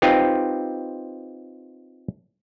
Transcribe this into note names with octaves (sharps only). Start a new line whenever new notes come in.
C4 D#4 F4 G4 B4